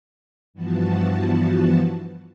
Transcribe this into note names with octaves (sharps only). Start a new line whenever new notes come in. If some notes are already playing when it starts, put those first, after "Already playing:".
G2 E3 F3 B3 F#4 A5